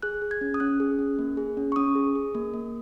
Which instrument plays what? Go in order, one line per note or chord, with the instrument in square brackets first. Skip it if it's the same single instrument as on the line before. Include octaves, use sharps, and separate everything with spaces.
[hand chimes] G#4 F#6
G#4
G#6
C#4
D#6
C#4 F#6
G#4
C#4
A#3
G#4
C#4
C#6
C#4 D#6
G#4
G#4
A#3
A#3